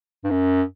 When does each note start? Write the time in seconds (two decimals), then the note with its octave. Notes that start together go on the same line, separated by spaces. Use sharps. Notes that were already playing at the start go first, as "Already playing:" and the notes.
0.24 G2
0.30 F#2